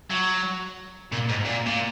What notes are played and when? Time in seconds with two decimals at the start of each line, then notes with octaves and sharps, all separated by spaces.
0.11 F#3
1.12 A#2
1.29 G#2
1.45 A#2
1.66 A#2